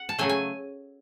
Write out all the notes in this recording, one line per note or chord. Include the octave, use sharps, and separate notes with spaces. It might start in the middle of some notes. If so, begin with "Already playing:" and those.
Already playing: F#5
A5
C#3 F#3 A3 G#5
G#5